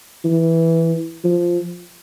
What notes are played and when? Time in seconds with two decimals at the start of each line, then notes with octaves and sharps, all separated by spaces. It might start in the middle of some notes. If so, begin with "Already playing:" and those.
0.24 E3
1.24 F3